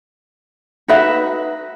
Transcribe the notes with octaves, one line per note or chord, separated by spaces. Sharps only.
D#4 F#4 B4 E5